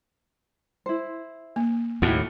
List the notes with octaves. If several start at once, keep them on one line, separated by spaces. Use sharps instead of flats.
E4 C5
A#3
D#2 A2 E4 F#4